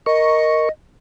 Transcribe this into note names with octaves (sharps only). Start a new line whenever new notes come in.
A#4 D#5 C#6